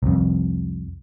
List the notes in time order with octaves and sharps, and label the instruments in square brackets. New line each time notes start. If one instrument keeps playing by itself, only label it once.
[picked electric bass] C2 F2